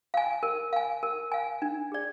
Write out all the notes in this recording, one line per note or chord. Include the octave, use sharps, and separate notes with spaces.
F5 G#5
A#4
F5 G#5
A#4
F5 G#5
D4
G#4 D5